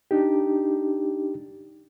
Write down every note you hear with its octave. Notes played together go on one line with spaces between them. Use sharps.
D4 D#4 G4